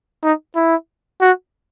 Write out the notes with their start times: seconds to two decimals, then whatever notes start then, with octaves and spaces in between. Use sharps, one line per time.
0.23 D#4
0.56 E4
1.21 F#4